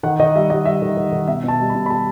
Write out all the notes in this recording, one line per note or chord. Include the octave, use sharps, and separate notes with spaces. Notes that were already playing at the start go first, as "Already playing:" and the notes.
D#3 F#5
D#3 D#5
G3 E5
G3 D#5
G3 E5
D#3
D#3
D#3
B2 E5
B2 A5
G3
B5
B2
B5
G3 A5